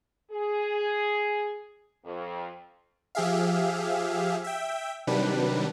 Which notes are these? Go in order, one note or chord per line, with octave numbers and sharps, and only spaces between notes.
G#4
F2
F3 G4 G#4 E5 F5
E5 G5
C3 D#3 F#3 G3 D4 B4